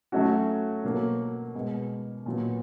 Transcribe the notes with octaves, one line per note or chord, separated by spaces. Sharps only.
F#3 A3 C#4 F#4
B2 F#3 A#3
B2 G#3 B3
A#2 F#3 B3